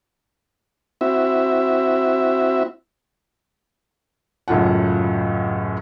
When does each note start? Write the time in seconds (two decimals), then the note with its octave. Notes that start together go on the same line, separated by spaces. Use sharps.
1.01 C4 E4 F#4 E5
4.48 C#2 F#2 A2 F4 F#5